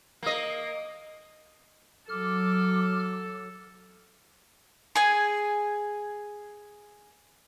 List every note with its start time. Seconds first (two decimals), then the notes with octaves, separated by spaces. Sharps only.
0.23 A#3 D#5
2.09 F#3 A4 D6 F6
4.95 G#4 G#5